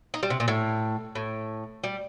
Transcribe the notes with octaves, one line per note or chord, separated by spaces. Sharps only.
D#4
G3
C3
A#2
A2
A2
G3